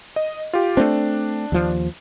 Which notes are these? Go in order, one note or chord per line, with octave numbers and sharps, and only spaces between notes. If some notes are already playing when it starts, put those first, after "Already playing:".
D#5
F4 G4
A3 C4 D4
D#2 F3